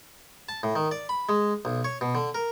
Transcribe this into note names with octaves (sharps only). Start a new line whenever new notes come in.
A5
A2
D#3
D5
B5
G#3
B1
C#5
B2
D3
A#4